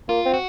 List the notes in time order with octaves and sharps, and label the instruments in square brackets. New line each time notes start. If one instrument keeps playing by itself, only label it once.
[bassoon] A#3 [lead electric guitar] F4
[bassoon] C4
[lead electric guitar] F#4